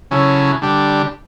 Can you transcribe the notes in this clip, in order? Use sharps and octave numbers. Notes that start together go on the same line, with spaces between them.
C#3 F#3 C#4 E4 A4
D3 G3 D4 G4